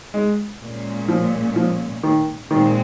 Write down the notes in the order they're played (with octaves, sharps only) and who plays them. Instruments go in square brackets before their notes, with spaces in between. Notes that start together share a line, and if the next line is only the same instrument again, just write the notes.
[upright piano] G#3
[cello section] A#2 G#3 C#4
[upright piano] F3
F3
D#3
[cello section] A#2 G#3 C4 [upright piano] D#3